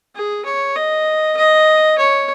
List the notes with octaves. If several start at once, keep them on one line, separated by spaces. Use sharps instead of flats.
G#4
C#5
D#5
D#5
C#5